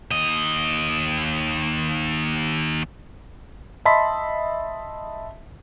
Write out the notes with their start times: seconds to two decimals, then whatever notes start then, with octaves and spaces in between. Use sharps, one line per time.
0.11 D#2 D#5
3.85 D#5 E5 A5 B5 C6 B6